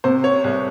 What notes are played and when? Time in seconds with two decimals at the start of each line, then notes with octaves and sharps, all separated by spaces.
0.04 C3 C5
0.24 C#5
0.44 C2